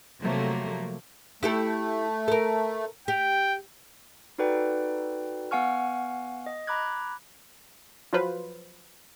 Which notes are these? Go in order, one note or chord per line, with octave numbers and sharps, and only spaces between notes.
C3 F3 F#3 A3 A#3
A3 E4 G4 A4
A4 A#4
G4 G5
D#4 F#4 A4 B4 D5 G5
B3 F5 F#5 G#5 C#6 F6
D#5
A#5 B5 D6 F#6 G#6
F3 F#3 F4 B4 C5